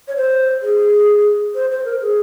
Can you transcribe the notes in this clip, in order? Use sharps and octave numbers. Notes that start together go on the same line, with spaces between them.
C#5
C5
G#4
C5
C5
A#4
G#4